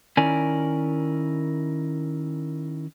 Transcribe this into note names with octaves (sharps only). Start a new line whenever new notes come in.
D#3 C#4 E4 A#4 D5 G#5